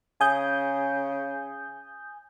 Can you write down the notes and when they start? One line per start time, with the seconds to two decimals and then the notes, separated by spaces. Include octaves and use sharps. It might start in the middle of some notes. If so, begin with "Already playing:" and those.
0.21 C#3 G#5 D#6 G6